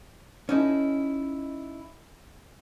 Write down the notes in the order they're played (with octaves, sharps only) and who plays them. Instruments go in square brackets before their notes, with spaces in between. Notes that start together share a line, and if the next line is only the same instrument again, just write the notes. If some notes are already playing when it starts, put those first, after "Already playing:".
[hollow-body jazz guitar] C#4 D#4 E4 A4